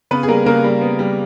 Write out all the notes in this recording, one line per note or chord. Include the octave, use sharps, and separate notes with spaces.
C#3 B3 B4
G#4
G3 A#3 A#4
C#3 A#3 A#4
G3
B3
G3